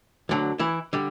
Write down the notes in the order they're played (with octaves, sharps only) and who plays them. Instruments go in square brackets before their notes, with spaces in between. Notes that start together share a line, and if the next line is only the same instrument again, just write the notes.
[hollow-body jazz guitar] D2 D3 F#3
E3 E4
D3 G3